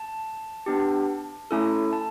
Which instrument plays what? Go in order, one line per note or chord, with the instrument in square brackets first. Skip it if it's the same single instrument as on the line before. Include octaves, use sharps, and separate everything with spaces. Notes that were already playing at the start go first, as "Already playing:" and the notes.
Already playing: [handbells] A5
B3 D4 G4
A3 C#4 E4 A4
A5